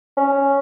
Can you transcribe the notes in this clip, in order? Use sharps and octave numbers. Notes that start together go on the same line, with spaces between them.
C#4